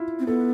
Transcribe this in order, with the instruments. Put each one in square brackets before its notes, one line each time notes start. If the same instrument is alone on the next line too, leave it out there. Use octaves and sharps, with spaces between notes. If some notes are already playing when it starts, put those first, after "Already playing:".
Already playing: [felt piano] E4 F4
[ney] C4
[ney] B3 [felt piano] A4